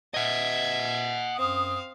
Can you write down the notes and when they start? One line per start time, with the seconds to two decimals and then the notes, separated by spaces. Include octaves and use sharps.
0.14 D#5 E5 F#5 G#6
1.37 F#2 C4 F5 D#6